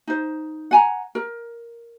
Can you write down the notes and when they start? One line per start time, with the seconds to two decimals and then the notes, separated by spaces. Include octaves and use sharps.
0.07 D#4 C5
0.71 F#5 G#5 A#5
1.15 A#4